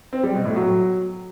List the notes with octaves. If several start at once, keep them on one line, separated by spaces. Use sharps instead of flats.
C4
G3
B2
A2
F#3